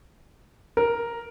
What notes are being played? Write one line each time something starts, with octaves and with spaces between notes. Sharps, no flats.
A#4